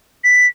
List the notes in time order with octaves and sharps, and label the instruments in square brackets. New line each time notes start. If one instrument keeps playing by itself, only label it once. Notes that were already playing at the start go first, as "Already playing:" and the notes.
[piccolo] B6